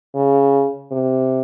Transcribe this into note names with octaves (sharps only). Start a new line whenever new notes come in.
C#3
C3